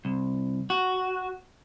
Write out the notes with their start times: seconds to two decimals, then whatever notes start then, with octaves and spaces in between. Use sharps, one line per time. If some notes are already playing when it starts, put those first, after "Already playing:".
0.05 C2
0.70 F#4